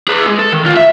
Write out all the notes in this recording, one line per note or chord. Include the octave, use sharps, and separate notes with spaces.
G#4 B4
G#3
A4
D#3
D2 F4
E5